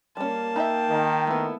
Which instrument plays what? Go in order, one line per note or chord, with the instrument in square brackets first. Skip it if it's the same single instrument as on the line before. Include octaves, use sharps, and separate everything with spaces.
[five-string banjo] G3 C#4 [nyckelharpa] A#3 A5
[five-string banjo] D#4 D#5 E5 [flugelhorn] G5
[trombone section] D#3
[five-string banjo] A3 B3 [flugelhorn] E4